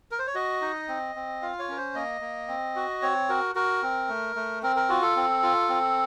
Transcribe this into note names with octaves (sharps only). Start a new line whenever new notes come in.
A#4
C5
C#5
F#4 D#5
D#4
C4
C4
F4 F5
C#5
C#4 A#4
C5
A#3 D#5
A#3
C4
F#4
C4 C#5
F#4 A#4
F#4 A#4
C4
A3
A3
C4 A#4
A#4
F4 F#4
A4
C4
F4
C4